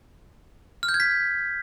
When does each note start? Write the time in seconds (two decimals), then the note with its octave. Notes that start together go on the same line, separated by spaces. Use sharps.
0.83 F6
0.89 G6
0.94 G#6
1.00 B6